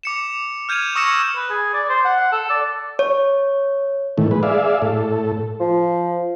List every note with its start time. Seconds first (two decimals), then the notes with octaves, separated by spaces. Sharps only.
0.03 D6 C#7 E7
0.69 F6 G6 G#6 D#7 F7
0.95 C#6 D#6 E6 A#6 C#7 E7
1.36 B4
1.50 G#4
1.74 D5
1.89 C5
2.05 F#5
2.32 A4
2.50 D5
2.99 C#5
4.18 A2 D#3 E3 A3
4.31 G#3 B4
4.43 G#4 D5 E5 F5
4.82 A2 A4
5.60 F3